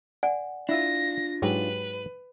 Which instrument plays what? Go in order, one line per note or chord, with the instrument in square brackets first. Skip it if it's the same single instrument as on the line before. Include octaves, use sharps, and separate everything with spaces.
[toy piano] D5 F#5 G#5
[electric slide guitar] D4 F4 [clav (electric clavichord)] E4 E5 [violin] A#6
[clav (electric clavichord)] G#2 F#3 G4 [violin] B4